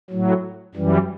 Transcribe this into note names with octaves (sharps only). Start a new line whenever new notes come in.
A2 F#3
F#2 E3 G3